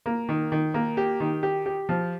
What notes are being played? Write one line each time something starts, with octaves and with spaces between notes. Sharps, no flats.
A#3
D#3
D#3
A#3
G4
D#3
G4
G4
F3